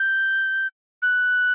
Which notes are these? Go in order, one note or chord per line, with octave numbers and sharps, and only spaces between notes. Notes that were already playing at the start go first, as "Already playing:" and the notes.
Already playing: G6
F#6